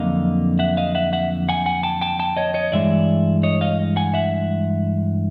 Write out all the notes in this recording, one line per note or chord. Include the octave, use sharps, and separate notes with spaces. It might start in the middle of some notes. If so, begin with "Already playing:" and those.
Already playing: F2 D3 F#3 A#3 D#5 F5
E5 F#5
D#5 F5
E5 F#5
E5 F#5
F#5 G#5
F#5 G#5
G5 A5
G5 A5
G5 A5
C#5 D#5
C#5 D#5
G2 E3 G#3 D5 E5
C#5 D#5
D#5 F5
F#5 G#5
E5 F#5